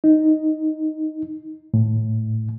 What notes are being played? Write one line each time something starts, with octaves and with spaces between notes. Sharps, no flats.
D#4
A2